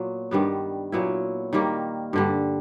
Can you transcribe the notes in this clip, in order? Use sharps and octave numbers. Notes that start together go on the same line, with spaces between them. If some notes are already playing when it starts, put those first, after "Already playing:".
Already playing: A#2 F#3 B3
G2 D#3 G3 B3
A#2 F#3 B3 E4
D#3 G3 A#3
G2 D3 G3